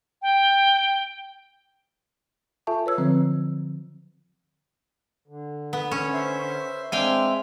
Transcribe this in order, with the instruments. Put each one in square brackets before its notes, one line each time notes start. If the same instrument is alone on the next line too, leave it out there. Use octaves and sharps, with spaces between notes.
[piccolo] G5
[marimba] F4 A4 E5 G#5 A5 C#6
B4 C#5 E6 G#6
D3 F3 F#3 C4
[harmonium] D3
[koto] B3
C#4
[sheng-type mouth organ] C5 E5
[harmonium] G#3 C4 E5 [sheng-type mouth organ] D4 [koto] F5 G5 G#5